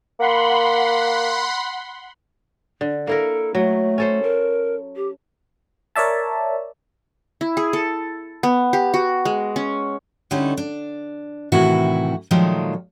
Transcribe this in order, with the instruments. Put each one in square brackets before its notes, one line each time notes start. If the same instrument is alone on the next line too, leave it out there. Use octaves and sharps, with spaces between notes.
[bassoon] A#3 [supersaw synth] F#5 B5 C6
[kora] D3
[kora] A#3 E4 A#4 [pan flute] A4
[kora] F#3 [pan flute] A3
[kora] C#4 A4 C5
[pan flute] A#4
G4
[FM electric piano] A#4 C#5 D5 E5 A5
[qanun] E4
G#4
A4
B3
G4
F#4
G#3
C#4
[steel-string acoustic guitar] D3 G3 C#4 D#4 E4 A4
D4
A2 C3 D#3 E3 E4 F#4
A#2 D#3 F3 F#3 G#3 A3